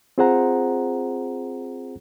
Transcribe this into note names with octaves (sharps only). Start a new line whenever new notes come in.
C4 F4 G#4 C5 F#5 A#5